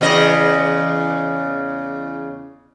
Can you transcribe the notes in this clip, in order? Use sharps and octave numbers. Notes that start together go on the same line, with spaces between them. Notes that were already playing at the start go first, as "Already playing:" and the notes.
E2 C#3 D#5